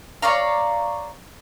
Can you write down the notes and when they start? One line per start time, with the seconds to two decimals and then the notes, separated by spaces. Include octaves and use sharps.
0.22 C#5 D5 F5 A#5